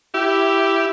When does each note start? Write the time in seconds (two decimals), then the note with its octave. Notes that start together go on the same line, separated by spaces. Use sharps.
0.14 E4 G4